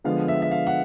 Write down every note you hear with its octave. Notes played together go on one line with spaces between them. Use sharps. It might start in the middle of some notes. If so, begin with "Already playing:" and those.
D3 F3 G#3 B3 F5
E5
E5
F5
F#5